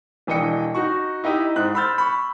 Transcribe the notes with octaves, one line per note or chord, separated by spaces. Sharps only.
E1 E3 D4 D#5 G5 C#7
D#4 F#4 C#6
D#4 E4 G4 D#5
G#2 C5 F#6
B5 C6 E6 F6 G6 A6
B5 C#6